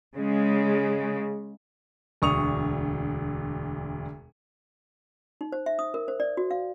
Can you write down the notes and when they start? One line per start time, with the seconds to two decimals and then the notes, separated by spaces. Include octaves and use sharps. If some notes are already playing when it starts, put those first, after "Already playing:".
0.14 C#3 G#3
2.22 E1 D2 C#6 D#6 F7
5.41 D#4
5.52 C5
5.66 E5
5.79 D#6
5.94 A#4
6.08 C5
6.20 D5
6.37 F#4
6.51 F5